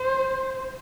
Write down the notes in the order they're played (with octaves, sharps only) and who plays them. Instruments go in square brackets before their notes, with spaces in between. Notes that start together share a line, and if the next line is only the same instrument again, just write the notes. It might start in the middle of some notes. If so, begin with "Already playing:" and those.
Already playing: [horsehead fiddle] C5